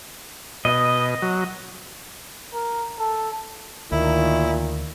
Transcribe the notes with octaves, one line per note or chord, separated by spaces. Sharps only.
B2 D#5
F#3
A#4
A4
D2 A#2 D#3 E4